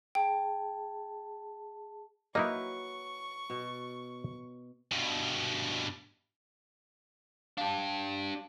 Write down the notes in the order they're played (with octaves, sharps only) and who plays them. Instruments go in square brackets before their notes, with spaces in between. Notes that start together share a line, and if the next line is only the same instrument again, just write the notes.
[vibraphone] G#4 A5 [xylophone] G5
[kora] F#3 B4 [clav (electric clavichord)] A#3 D#4 E4 [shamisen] D#5 [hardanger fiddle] C#6
[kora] B2
[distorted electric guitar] G2 B2
[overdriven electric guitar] D4 G4 [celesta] F5 A5